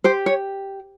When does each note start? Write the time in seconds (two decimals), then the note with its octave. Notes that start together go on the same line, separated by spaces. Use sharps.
0.04 G4 C5
0.26 C#5